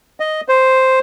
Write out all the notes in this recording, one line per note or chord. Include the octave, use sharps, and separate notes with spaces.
D#5
C5